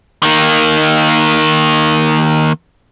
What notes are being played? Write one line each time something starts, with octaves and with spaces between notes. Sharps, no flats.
D#3 A#3